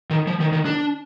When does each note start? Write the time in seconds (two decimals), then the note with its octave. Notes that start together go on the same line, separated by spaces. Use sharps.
0.11 D#3
0.27 F3
0.40 D#3
0.53 D#3
0.65 D4